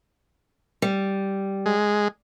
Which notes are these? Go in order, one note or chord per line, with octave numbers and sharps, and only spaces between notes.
G3
G#3